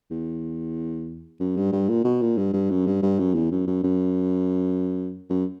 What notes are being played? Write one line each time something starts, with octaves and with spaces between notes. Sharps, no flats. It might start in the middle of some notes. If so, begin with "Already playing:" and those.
E2
F#2
G2
G2
A#2
B2
A#2
G2
G2
F#2
G2
G2
F#2
E2
F#2
F#2
F#2
F#2